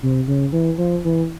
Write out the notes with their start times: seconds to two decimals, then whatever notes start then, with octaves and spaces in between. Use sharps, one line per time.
0.03 C3
0.28 C#3
0.52 E3
0.78 F3
1.05 E3